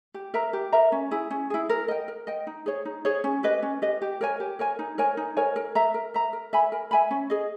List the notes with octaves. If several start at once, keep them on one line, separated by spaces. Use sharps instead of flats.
G4
A#4 E5 A#5
G4
A#4 E5 A#5
C#4
E4 G#4
C#4
E4 G#4
A#4
D#5 G5
A#4
D#5 G5
D#4
G#4 C#5
D#4
G#4 C#5
C#4
G4 B4 D#5
C#4
G4 B4 D#5
G4
A#4 C#5 G#5
G4
A#4 C#5 G#5
D#4
A#4 C#5 G#5
D#4
A#4 C#5 G#5
A#4
E5 A#5
A#4
E5 A#5
A#4
E5 G#5 B5
A#4
E5 G#5 B5
C#4
G#4 D#5